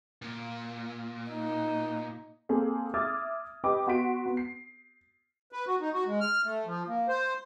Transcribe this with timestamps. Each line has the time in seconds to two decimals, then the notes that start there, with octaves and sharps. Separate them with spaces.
0.22 A#2
1.31 D#4
2.49 A#3 C4 G#4 A4
2.94 E5 D6 D#6 F6 G#6 A6
3.64 G4 B4 D#5 G5 D6
3.87 B3 F#4 C6 B6 D7
4.26 B3
4.37 C7
5.52 B4
5.67 F#4
5.80 D#4
5.94 F#4
6.06 G#3
6.21 F6
6.44 A3
6.66 F3
6.88 A#3
7.08 C5